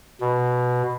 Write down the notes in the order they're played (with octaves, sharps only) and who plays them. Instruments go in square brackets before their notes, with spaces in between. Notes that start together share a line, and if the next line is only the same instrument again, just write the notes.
[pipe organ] B2